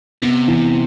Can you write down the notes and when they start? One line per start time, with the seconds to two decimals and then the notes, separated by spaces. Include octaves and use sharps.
0.22 C3 B3
0.48 E3